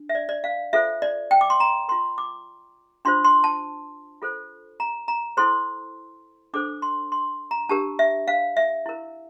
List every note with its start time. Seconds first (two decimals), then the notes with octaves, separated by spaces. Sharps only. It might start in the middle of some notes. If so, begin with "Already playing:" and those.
Already playing: D4
0.09 E5
0.15 D5
0.29 D5
0.44 F5
0.73 F4 A4 C5 E5
1.02 D5
1.31 G5
1.41 D6
1.50 C6
1.60 A#5
1.88 F4 A#4 C6
2.18 D6
3.05 D4 F4 C5 C6
3.24 C6
3.44 A5
4.22 F4 A4 C5
4.80 A#5
5.08 A#5
5.37 E4 A4 C5 C6
6.54 D4 A4 C5 D6
6.82 C6
7.12 C6
7.51 A#5
7.69 D4 G4 A#4 A5
7.99 E5
8.28 F5
8.57 E5
8.86 E4 A#4